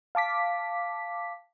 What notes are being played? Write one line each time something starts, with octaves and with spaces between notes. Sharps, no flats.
F5 A5 D6 B6